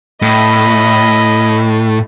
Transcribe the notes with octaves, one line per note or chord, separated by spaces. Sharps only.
A2 D#5 B5